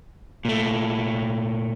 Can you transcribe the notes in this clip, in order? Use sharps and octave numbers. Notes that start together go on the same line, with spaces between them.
A#2 A3